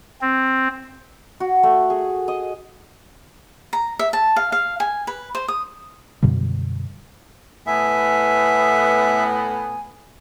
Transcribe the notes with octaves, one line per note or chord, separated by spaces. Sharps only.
C4
F#4
A3
G#4
D#5
A#5
E5
A5
F5
F5
G#5
B4
C5
D#6
F#2 B2 D3 G3
A2 B3 E5 G#5